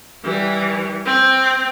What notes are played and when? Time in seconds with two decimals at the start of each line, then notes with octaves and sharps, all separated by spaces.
0.24 E3 G3
1.05 C4